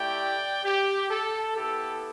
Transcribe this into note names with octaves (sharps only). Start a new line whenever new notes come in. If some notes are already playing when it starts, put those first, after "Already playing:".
Already playing: A3 E4 G4 D5 G5
G4
A4
B3 E4 G4 A4